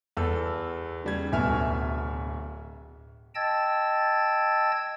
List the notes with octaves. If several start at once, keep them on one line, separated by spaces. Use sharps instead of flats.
E2 A4 E6
C#3 G3 G#6
D1 B2 E5 G#5 F6
D#5 G5 A5 E6 G#6 A6